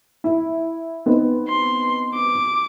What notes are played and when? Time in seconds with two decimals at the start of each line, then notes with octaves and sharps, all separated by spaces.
0.24 E4
1.06 B3 C4 D#4
1.48 C6
2.14 D6